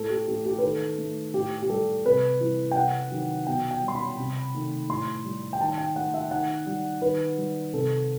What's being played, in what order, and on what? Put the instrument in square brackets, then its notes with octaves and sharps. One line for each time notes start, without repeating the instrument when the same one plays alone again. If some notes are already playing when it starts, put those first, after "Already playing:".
Already playing: [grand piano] A2 A4
G4
E3 A3 G4
G4
B4
D#3 A4
A3
A2 G4
G4
G3 A4
C3 B4
E3 G3
G5
C3 F#5
D#3 F#3
B2 G5
G5
G3
C6
B5
C3
D#3 A3
A2 C6
G3
G5
D#3 A5
G5
A3 F#5
E5
D#3 F#5
G3
D#3 B4
G3
C3 A4